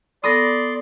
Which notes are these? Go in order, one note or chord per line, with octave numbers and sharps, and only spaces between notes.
B3 A4 D5 B5 C6 D#6 A#6